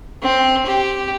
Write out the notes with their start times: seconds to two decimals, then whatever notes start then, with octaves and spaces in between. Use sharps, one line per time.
0.22 C4
0.66 G4